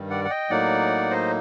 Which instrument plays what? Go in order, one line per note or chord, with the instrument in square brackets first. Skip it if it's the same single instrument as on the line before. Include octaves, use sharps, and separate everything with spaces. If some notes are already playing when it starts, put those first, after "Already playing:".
Already playing: [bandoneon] G2 D#3 G3
D5 F#5
F#5
D#5 G5
A2 F#3 A#3 D#4 D5 F#5
C5 D#5